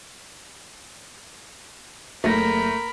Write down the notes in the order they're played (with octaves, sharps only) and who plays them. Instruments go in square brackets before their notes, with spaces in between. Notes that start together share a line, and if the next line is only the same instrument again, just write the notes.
[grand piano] F#1 A#6 [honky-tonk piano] A3 [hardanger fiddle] A#4 B5